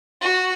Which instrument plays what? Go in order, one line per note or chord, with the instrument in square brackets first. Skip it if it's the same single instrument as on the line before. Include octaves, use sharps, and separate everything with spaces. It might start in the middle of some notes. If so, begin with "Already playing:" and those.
[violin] F#4